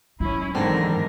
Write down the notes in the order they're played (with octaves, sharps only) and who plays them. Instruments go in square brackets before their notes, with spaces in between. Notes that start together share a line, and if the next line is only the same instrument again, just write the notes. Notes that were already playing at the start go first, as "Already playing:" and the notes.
[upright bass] F#3 [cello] C#4 E4
[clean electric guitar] E2 G#2 D3 [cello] D#3 A#4 [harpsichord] C4